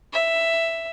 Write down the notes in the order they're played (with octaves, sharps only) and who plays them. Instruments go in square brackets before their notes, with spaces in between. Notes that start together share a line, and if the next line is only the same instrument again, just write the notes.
[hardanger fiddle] E5